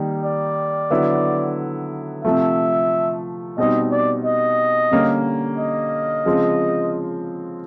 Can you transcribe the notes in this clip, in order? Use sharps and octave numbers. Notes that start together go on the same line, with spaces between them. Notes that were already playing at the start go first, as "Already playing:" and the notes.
Already playing: D#3 G3 A#3 D#4
D5
D3 F#3 B3 E4
C3 F3 A3 E5
B2 G3 C4 D#4 D#5
D5
D#5
D3 G3 A#3 C#4
D#5
C#3 F3 G#3 C4